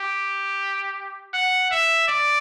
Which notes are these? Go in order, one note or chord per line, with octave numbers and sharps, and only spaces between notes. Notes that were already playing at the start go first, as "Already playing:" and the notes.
Already playing: G4
F#5
E5
D5